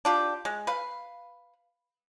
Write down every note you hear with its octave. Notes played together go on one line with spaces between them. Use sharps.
D4 F4 G4
G#3
B4 F5